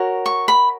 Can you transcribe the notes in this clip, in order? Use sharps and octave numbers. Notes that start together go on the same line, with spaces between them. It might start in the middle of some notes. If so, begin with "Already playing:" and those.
Already playing: F#4 A#4 C#5
C#6
B5